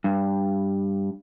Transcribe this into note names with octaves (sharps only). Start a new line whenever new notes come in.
G2